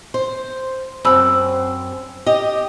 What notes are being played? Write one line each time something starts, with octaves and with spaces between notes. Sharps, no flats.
C5
F#2 C4 C5 B5 E6
G4 D#5